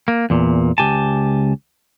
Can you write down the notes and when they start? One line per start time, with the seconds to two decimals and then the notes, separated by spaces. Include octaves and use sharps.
0.08 A#3
0.30 E2 A#2
0.78 C#2 G4 G#5 A5